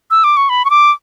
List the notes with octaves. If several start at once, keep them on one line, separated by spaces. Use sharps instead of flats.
E6
D6
C#6
B5
C#6
D6